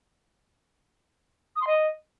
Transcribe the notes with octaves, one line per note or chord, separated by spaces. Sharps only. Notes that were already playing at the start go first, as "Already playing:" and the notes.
D#6
C6
D#5